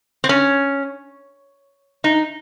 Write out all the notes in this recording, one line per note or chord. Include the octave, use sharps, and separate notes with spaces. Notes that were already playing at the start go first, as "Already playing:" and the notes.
C4
C#4
D#4